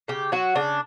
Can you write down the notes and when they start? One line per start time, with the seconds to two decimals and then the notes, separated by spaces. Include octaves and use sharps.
0.08 C#3 G4
0.32 F#3 F#4
0.55 C#3 D4